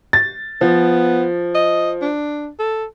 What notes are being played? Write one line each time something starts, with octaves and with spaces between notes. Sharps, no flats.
A6
F3 B3
D#5
D4
A4